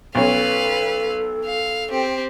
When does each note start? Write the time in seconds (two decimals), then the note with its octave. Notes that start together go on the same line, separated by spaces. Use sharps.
0.15 B1 C#4 A4 B4 F5
1.45 F5
1.90 C4 G4